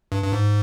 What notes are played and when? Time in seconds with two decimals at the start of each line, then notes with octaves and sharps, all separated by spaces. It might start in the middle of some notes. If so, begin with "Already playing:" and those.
0.12 G2
0.23 G2
0.32 G#2